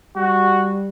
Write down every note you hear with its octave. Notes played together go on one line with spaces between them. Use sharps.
G3 F#4